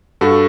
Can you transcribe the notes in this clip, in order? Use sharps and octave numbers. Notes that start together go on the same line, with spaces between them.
G2 F#4 A4